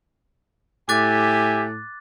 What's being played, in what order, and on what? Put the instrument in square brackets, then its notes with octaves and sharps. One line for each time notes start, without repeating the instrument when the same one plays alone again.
[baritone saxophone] A2 [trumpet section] G4 E5 G#5 [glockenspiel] D6 F#6 A6